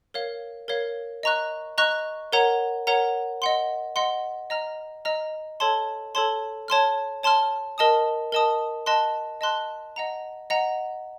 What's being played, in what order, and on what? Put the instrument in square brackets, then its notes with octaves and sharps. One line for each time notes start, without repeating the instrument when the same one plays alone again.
[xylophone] A#4 C#5 F5
A#4 C#5 F5
D#5 A#5 C#6 F#6
D#5 A#5 C#6 F#6
A#4 C#5 F#5 A#5
A#4 C#5 F#5 A#5
D#5 F#5 C6
D#5 F#5 C6
D#5 A#5 F6
D#5 A#5 F6
A4 C#5 A5 C6
A4 C#5 A5 C6
C#5 A5 C6 F6
C#5 A5 C6 F6
A#4 D#5 A5 D#6
A#4 D#5 A5 D#6
D#5 A5 C6 F#6
D#5 A5 C6 F#6
D#5 F#5 A#5
D#5 F#5 A#5